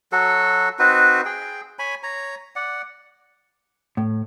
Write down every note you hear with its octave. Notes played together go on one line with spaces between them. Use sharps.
F#3 F#4 A4
C4 D#4 F#4 B4
G#4 G5
C#5 G#5 B5
C#5 A#5
D5 F#5
A2